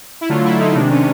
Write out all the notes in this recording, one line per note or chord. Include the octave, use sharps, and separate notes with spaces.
E4
D3 F#3 A3 F4
E4
D#4
C3 D#3 G#3 D4
C#4